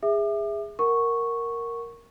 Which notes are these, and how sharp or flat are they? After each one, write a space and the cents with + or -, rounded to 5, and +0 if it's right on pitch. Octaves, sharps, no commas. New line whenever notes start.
G#4 -20 E5 +0 D6 +40
A#4 +0 F#5 +0 C#6 -5